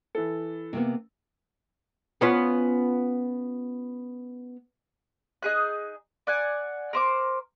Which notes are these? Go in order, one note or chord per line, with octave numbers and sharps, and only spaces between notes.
E3 A4
C3 A#3 B3
B3 C#4 F4
D#4 G#4 F#6
D5 F#5 G#5
A#4 C5 D6